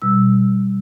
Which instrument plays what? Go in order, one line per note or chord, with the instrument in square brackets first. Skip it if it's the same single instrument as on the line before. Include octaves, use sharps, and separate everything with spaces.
[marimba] B2 G3 E6